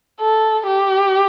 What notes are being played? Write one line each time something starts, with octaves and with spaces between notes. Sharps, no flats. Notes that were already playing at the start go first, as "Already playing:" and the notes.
A4
G4